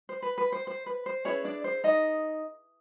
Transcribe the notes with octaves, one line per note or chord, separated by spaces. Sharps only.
C5
B4
B4
C5
C5
B4
C5
C#4 E4 G#4 B4 C#5
D4 D5
C5
D#4 D#5